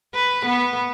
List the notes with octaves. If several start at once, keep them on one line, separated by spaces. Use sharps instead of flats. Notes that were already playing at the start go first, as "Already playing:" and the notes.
B4
B3